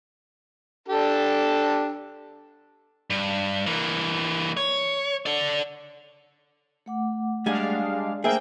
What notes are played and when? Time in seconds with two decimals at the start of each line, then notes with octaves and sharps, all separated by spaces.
0.88 D4 G4 A4
3.10 G2
3.67 E3 A#3
4.57 C#5
5.26 A4 D5
6.86 A3 F#5 D6
7.46 G3 G#3 D4 F5 G#5
8.24 A3 A#3 G#4 C5 E5 G5